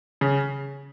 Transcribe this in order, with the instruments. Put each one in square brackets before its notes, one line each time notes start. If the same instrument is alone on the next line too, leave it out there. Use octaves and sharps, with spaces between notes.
[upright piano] C#3